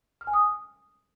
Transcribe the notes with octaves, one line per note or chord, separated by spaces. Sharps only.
F6
G#5
D#6